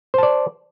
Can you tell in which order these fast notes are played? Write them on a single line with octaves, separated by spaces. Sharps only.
C5 A5 D5